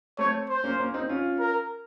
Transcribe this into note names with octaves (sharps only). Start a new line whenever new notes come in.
A3 C4 C#5
C5
A#3 C#4
A#3 C#4
C4 D#4
C#4 F4
A#4